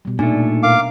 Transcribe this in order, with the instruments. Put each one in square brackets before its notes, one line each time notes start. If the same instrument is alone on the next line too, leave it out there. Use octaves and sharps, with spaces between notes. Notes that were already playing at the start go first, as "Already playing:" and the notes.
[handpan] B2 G3
[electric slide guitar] A#2 A3 [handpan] D4 [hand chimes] D#4 G#5
[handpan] B2 A#4 [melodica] F5 D6